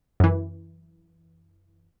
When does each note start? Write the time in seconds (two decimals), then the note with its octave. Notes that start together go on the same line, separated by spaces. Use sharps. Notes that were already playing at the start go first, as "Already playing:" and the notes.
0.20 F#2 E3